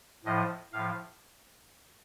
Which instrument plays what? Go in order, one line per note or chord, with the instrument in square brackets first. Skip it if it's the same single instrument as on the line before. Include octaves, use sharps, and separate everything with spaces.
[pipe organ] A2 F3 D#5
A2 F3 F5